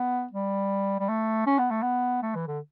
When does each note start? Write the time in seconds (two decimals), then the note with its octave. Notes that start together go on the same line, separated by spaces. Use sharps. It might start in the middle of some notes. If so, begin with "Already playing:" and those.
Already playing: B3
0.33 G3
1.00 G3
1.09 A3
1.47 C#4
1.59 B3
1.71 A3
1.83 B3
2.23 A3
2.35 E3
2.48 D3